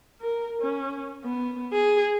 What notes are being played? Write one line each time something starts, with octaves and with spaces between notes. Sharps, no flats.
A#4
C#4
B3
G#4